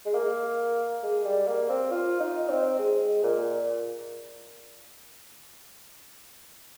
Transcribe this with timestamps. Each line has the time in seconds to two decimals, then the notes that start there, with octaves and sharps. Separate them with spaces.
0.06 G#3
0.15 A#3
1.03 G#3
1.25 G3
1.48 A#3
1.69 C4
1.91 F4
2.20 D#4
2.49 C4
2.79 G#3
3.24 A#2